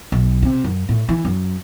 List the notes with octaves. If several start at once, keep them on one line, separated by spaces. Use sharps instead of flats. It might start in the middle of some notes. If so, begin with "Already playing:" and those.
B1
C3
F#2
A2
E3
F#2